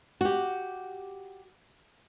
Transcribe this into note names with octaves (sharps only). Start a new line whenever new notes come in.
F#4 G4